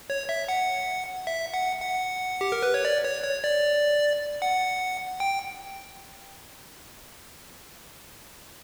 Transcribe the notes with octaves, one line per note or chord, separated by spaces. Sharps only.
C#5
E5
F#5
E5
F#5
F#5
G4
A#4
B4
C#5
D5
C#5
C#5
D5
F#5
G5